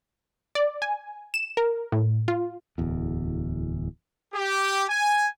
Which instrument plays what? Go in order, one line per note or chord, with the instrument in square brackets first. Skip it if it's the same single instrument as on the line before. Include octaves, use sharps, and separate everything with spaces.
[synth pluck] D5
G#5
E7
A#4
A2
F4
[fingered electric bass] D1 E2
[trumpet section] G4
G#5